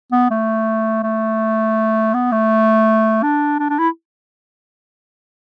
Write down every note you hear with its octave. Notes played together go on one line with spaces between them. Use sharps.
B3
A3
A3
B3
A3
D4
D4
D4
E4